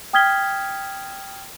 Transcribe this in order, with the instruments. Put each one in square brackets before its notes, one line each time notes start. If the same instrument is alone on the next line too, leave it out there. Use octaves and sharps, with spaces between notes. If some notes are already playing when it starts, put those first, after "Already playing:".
[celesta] G5 D#6 F6 G#6 B6 G7